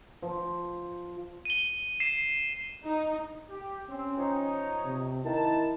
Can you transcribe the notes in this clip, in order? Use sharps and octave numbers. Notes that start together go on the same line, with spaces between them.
F3
D#7 G7
C7 E7
D#4
G4
C4 C#4
F3 D#4 C#5
C3
D#3 E4 A5